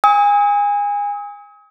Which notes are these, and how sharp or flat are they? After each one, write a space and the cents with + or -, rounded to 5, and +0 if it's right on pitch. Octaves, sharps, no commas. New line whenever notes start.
G#5 -25 D#6 +40